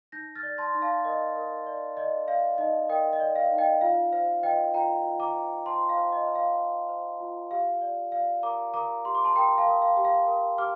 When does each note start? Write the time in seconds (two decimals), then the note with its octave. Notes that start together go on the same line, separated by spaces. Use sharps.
0.12 D#4 G6 A#6
0.36 F6 A6
0.43 D5
0.58 A5 C6
0.74 D#4
0.82 F5 A5
1.05 A#4 D#5
1.36 A#4
1.67 D5
1.97 D5 D#5
2.28 D5 F5
2.58 D#4 D#5
2.89 A#4 D#5 G5
3.13 D#5
3.20 D5
3.36 F5
3.51 D#4
3.58 D#5 G5
3.81 F4 F5
4.12 C5 F5
4.43 C5 D#5 G5
4.74 F4 G5 A#5
5.05 F4
5.20 A#5 D6
5.35 C5
5.66 C5 A5 C6
5.89 F5
5.97 C5
6.12 D#5
6.28 C5
6.35 F5
6.58 C5
6.89 C5
7.20 F4
7.51 G4 F5
7.81 D5
8.12 D5 F5
8.43 A#4 A#5 D6
8.74 A#4 A#5 D6
9.05 G4 C6
9.15 D6
9.24 A5 C6
9.36 A#4 G5 A#5
9.58 F5 A5
9.66 A#4
9.82 F5
9.97 G4
10.05 F5
10.27 A#4
10.58 G4 D6 F6